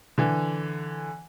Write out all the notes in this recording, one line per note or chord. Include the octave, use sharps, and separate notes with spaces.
D3 E3